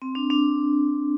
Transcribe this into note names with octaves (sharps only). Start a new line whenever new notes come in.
C4
D4
D4